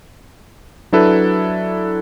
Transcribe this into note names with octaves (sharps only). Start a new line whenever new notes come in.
F#3 D4 E4 A4 B4